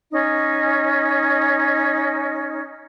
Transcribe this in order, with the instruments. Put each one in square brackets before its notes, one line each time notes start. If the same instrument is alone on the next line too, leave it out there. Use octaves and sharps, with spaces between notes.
[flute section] C#4 D#4